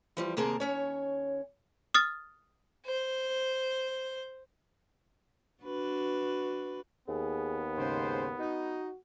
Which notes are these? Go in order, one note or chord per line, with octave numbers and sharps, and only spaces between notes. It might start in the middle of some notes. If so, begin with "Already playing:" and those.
E3 F3 G3
D#2 C3 A#3 G#4 A#4 A5
D#2 C#4 C#5
D#6 F6 A6
C5
D4 F#4 B4
D#2 B3 G#4
G#2 C#3 C5
D#4 F#4